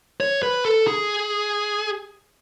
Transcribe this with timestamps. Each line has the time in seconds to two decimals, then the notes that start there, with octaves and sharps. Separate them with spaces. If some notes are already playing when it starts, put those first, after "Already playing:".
0.20 C#5
0.43 B4
0.65 A4
0.87 G#4